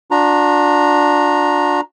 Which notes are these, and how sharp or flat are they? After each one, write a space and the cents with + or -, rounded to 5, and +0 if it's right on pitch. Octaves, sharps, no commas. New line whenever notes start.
D4 +0 F#4 -45 A#5 +0